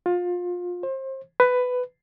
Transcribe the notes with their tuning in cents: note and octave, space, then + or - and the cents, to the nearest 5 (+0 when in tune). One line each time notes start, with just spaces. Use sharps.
F4 +25
C5 +30
B4 +15